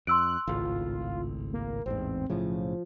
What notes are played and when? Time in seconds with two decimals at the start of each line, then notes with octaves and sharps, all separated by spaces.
0.07 F2 C6 E6 F#6 D7
0.47 G#1 C#2 A2 F4
1.53 A#3
1.86 A1 E2 G#2 C4
2.30 B1 A2 C#3 F3